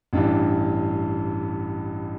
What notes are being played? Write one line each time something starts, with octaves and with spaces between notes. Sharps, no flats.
A1 G2 E3 D4